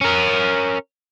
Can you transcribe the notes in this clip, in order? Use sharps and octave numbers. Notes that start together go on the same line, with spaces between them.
C#4 A#4